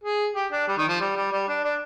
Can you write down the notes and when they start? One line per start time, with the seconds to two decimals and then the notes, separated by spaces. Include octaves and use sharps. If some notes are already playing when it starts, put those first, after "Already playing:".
0.04 G#4
0.35 G4
0.52 D4
0.68 G3
0.78 D#3
0.88 F3
1.00 G3
1.16 G3
1.32 G3
1.48 D4
1.64 D4